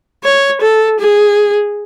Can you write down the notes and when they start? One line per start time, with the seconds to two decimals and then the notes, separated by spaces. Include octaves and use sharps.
0.24 C#5
0.62 A4
1.00 G#4